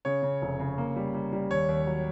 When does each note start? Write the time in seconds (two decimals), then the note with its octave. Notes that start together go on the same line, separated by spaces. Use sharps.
0.05 C#3 C#5
0.23 C#3
0.42 F1
0.60 C#3
0.78 A#3
0.96 G3
1.14 G3
1.33 G3
1.51 D#2 C#5
1.69 D#2
1.87 F#3